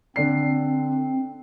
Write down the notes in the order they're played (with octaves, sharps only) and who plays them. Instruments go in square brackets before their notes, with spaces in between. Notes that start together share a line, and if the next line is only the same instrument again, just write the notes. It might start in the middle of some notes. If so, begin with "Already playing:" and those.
[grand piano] D3 D5 C7 [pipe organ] C4